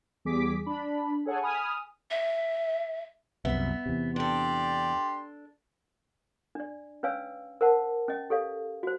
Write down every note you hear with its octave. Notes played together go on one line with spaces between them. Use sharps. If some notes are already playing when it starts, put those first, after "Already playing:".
E2 G3 G#4 D6 B6
D4 B5
G#4 A4 C#5 F#5 G#5
G#5 B5 D#6 F6
E5
C2 F#2 B3 E5
E2 C3
D4 G4 A4 D5 C6
D4 D5
C#4 B4 C#5 F5 G#5 E6
A#4 C5 F#5 A5
C#4 D#5
G4 A4 C#5 F5
F#4 C5